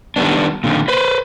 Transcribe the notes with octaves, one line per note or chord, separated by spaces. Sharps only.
D#3 G3 B3 D4
A#2 D3 D#3
B4 C5